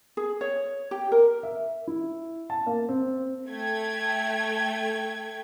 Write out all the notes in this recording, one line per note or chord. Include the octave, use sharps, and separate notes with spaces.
G#4
C#5
G4
A#4
E5
E4
A5
A#3
C4
A3 G5 G#6